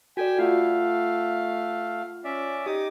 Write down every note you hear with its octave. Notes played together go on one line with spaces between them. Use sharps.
F#4 A4 D5 G5 G#5
A3 F4 F5 F#5
C#4 D5 E5
D#4 G4 D6 D#6